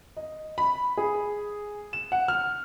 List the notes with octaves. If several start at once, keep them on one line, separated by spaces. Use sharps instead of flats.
D#5
B5
G#4
E7
F#5
F6